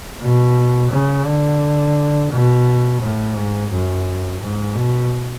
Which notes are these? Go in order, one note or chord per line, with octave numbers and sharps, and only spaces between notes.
B2
C#3
D3
B2
A2
G#2
F#2
G#2
B2